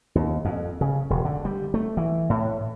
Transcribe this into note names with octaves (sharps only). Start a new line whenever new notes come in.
D#2
F2
C#3
E1
D3
G3
A3
E3
A2